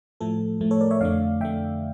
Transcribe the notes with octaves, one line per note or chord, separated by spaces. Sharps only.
A2 F3 A3 A4
A2 F3 A3
A4 C#5
A#4 D5
C#5 E5
F2 D3 A3 D5 F5
F2 D3 A3 E5 G5